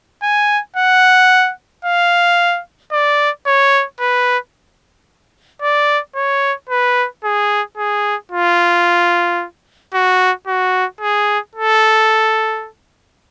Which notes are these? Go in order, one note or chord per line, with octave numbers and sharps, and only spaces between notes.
G#5
F#5
F5
D5
C#5
B4
D5
C#5
B4
G#4
G#4
F4
F#4
F#4
G#4
A4